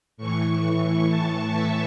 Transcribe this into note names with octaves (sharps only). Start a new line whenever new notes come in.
A2 E3 C#6
A5
E5